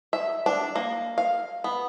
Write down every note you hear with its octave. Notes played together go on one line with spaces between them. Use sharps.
E5
D4
A#3
F5
B3